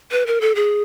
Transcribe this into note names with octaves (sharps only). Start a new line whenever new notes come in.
B4
A#4
A4
G#4